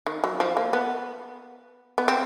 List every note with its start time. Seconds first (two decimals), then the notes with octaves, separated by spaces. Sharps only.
0.06 D#3
0.24 F#3
0.40 F3
0.57 A#3
0.73 B3
1.98 B3
2.08 C4